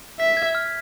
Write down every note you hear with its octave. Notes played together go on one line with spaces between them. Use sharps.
E5 B6
G#6
F6